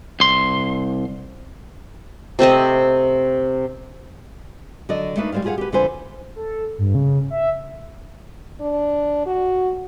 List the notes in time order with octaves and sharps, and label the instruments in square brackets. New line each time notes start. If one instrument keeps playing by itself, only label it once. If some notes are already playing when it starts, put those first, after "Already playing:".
[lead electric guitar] C2 C6
[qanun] C3 A3 C4 D#5
[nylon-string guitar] D3 F#3 A4 D5 D#5
A3 A#3 D4 D#4 B4
G3 G#3 C5 D5 F5
F4 G4 G#4 B4 F5 F#5
G4 B4
F2 D3 F4 B4 C5 G#5
[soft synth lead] A4
G2
C#3
E5
[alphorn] D4
F#4